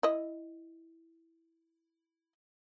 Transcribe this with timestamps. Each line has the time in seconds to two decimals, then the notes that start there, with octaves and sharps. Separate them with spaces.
0.03 E4 D#5